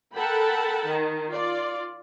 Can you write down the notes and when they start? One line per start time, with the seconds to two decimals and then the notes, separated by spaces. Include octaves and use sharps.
0.16 A4 A#4 F#5 G5 A5 B5
0.89 D#3
1.29 F4 D5